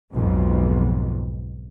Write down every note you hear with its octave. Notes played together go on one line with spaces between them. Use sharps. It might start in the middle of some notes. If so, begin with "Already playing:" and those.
B1 F2 G#2